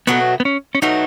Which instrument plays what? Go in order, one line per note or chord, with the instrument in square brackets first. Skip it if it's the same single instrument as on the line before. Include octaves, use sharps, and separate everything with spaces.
[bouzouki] B2 F#3 A3 [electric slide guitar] B3
[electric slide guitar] B3
C#4
C#4
[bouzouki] B2 F#3 A3 [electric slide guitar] D#4